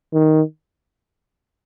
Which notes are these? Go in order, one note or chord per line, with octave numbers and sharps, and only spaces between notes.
D#3